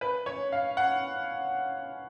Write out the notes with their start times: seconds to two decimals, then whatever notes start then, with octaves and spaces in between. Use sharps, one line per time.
0.01 B4
0.26 C#5
0.52 F5
0.77 F#5